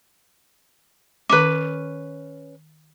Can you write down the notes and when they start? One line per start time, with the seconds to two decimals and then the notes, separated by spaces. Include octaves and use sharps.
1.29 D#3 C#4 B4 D6